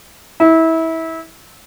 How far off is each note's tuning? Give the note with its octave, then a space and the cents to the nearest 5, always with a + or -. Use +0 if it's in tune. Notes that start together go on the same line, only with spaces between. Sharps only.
E4 -25